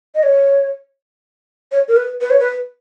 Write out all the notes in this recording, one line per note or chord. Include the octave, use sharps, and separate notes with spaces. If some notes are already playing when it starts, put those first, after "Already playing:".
D#5
C#5
C#5
A#4
B4
B4
C#5
B4